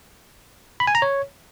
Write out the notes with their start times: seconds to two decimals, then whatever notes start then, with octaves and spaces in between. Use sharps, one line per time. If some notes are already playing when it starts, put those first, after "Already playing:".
0.80 B5
0.87 G#5
0.95 A#5
1.02 C#5